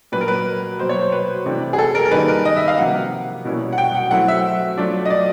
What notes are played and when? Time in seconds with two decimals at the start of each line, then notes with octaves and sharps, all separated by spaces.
0.12 A#2 F#3 A#3 B4
0.21 A#4
0.28 B4
0.79 B2 F#3 A#3 C5
0.89 C#5
1.01 C5
1.12 B4
1.45 C3 E3 A3 D4
1.73 G#4
1.78 A4
1.95 A#4
2.05 A#4
2.11 D#3 G3 A#3 D#4 B4
2.28 A#4
2.45 D#5
2.56 E5
2.68 F5
2.78 C3 F3 A#3 F#5
3.45 B2 G3 A#3 C#4 E4
3.73 F#5
3.78 G5
3.95 F#5
4.11 F#3 A3 C4 E4 F#5
4.28 E5
4.77 F#3 A3 D4 F4
5.05 D#5
5.10 D5